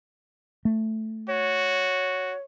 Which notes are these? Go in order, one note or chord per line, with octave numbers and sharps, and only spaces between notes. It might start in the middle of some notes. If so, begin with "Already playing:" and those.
A3
F#4 C#5